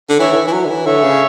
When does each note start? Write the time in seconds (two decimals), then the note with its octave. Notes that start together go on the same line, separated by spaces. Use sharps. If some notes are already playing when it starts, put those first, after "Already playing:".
0.09 D3
0.19 E3 C#5 E5
0.33 D3
0.36 E3
0.47 E3
0.53 F#3
0.65 D3
0.69 E3
0.86 D3 C#5 E5
1.03 C#3